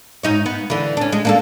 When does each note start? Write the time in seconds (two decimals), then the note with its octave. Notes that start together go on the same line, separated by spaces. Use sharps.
0.23 G#2 D#4 C#5
0.46 B3
0.70 D3 E3
0.97 C#4 D4
1.12 G#3
1.25 A#3 D4 A4